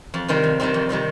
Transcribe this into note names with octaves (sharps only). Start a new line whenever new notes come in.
F2
C3 D#3 G3 C4
F2
C3 D#3 G3 C4
F2
C3 D#3 G3 C4